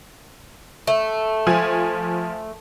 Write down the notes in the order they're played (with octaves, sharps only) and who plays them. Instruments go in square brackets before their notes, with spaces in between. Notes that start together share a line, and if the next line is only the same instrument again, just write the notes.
[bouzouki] A3
[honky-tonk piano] F3 G#5